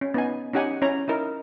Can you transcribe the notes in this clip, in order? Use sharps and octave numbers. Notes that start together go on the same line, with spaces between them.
C#4
B3 D#4 G#5
C#4 D#4 G4 F#5 G#5
C#4 E4 C#5 A#5
D#4 E4 A#4